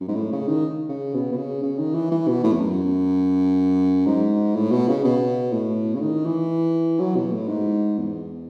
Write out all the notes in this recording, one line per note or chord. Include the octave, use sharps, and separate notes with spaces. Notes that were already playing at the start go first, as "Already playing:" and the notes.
F#2
G#2
A2
C#3
D#3
C#3
B2
B2
C#3
C#3
D#3
E3
E3
B2
A2
E2
F#2
G#2
A2
B2
C#3
B2
A2
C#3
D#3
E3
F#3
B2
A2
G#2
E2